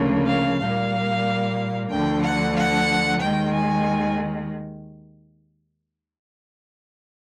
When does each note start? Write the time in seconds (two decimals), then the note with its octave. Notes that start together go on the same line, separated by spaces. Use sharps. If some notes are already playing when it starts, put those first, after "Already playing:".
Already playing: D2 C#3 F3 A#3
0.26 F5
0.58 A#2 G3 A#3 F5
1.90 D2 D3 F3 G5
2.22 F#5
2.55 F#5
3.21 D#2 D#3 G#3 G5
3.53 G#5